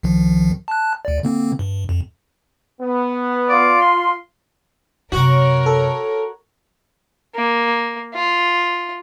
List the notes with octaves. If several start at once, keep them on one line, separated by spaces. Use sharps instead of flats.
C2 D#3 F3
A5 F#6
D2 D5
D3 A#3 C4
G2
F2
B3
F4 D5
C6
F#2 C3 F#4 A#4 C#5
A4
A#3
F4